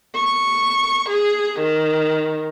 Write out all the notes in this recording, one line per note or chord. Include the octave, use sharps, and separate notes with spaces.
C#6
G#4
D#3